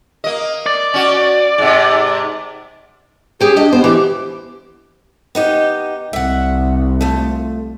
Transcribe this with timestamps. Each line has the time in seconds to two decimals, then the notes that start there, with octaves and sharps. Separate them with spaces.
0.24 A#3 D#5
0.66 D5
0.94 C#4 F#4
1.58 G#2 C3
3.41 C#4 G4 G#4
3.56 D4 G4 D#5
3.73 B3 C5
3.84 E3 G4
5.35 B3 D#4 G4
6.13 C2 E5 F#5
7.01 F3 A3